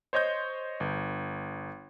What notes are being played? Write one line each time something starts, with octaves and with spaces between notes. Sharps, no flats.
C5 C#5 D#5 C#6 G6
G1